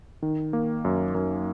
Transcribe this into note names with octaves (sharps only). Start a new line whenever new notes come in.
D#3
A#3
F#2
F#2